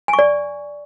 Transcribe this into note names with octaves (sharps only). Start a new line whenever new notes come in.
G#5
C#6
D5